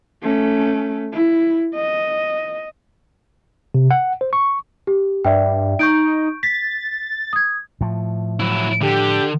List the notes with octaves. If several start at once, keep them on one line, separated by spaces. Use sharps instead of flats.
A3 C#4
E4
D#5
C3
F#5
C5
C#6
G4
G2 D5 E5 G5
D#4 C#6 G6 D7
A6 B6
D#6 G#6
A2 F3
F#3 E4
D3 G4